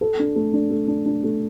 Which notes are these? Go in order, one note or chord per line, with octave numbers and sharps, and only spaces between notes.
A4
D4
A3
D4
A3
D4
D4
A3